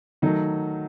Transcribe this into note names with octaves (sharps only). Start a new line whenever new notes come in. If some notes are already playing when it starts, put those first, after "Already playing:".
D#3 F#3 A3 D#4